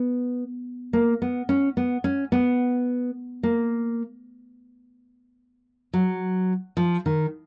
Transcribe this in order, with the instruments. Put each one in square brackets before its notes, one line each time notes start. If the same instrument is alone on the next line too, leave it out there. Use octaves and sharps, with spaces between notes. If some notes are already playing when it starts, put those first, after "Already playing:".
Already playing: [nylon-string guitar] B3
A#3
B3
C#4
B3
C#4
B3
A#3
F#3
F3
D#3